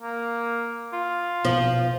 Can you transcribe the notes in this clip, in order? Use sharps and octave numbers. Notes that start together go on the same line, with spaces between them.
A#3
F4
A#1 B2 F3